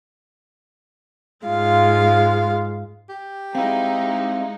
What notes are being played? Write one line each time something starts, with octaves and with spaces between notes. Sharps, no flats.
G#2 G#3 F4 F5
G4
G#3 C4 D#4 E4 F5